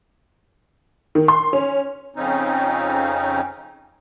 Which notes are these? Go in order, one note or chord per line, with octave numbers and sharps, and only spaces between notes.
D#3
C6
C#4
F2 C#3 C4 C#4 D#4